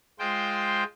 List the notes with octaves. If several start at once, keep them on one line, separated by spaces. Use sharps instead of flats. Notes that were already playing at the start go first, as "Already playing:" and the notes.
G#3 F4 C5 G5